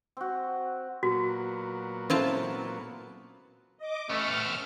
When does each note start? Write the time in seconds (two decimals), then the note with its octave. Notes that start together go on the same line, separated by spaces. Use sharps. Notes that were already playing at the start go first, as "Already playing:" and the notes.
0.17 C4 F#4
1.03 A#2 F#3 B3 F#4
2.10 C4 C#4 E4 F4 A4 A5
3.78 D#5 D6
4.10 A2 A3 B3 C#4 A4 F6